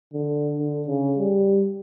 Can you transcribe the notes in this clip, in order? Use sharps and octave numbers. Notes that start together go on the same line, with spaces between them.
D3
D3
C#3
G3